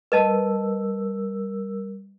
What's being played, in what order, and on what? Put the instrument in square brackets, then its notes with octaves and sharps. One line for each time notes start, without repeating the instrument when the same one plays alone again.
[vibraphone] G3 A#4 E6 [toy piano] B4 D#5 A5